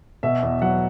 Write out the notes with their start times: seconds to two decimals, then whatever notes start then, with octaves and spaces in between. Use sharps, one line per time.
0.23 B2 E5
0.43 E2
0.62 F#3 F#5